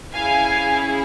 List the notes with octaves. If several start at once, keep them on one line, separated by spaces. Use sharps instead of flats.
C#4 E4 G#4 F5 G#5